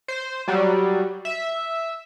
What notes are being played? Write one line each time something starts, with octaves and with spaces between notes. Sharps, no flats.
C5
F#3 G3
E5